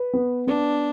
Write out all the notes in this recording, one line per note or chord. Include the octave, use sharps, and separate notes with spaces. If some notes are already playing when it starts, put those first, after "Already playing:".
Already playing: B4
B3
B3 D4